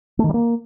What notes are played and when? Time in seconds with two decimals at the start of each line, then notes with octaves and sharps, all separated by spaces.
0.19 A3
0.24 D#3
0.29 G3
0.34 A#3